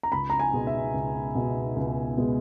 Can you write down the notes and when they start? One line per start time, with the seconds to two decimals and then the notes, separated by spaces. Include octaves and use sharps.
0.03 A#5
0.12 C#2 B5
0.30 A#5
0.39 G#5
0.53 B2 G#3 B3
0.67 E5
0.94 C#2
1.35 B2 G#3 B3
1.76 C#2
2.17 B2 G#3 B3